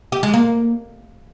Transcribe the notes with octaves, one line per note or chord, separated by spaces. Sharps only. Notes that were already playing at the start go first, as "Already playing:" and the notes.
G4
G#3
A#3